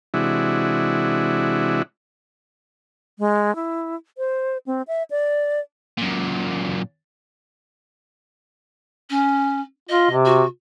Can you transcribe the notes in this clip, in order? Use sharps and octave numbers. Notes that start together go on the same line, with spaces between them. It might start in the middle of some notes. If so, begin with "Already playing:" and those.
C3 E3 G#3 D4 E4 F#4
G#3
E4
C5
C4
E5
D5
F#2 A#2
C#4
F4 D#5
C3
F#4